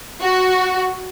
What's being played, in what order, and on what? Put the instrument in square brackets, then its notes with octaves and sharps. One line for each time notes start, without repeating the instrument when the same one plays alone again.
[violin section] F#4